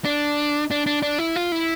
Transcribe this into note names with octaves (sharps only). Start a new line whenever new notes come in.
D4
D4
D4
D4
E4
F4
E4